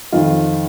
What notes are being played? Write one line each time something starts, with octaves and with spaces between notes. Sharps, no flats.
F2 D#3 F4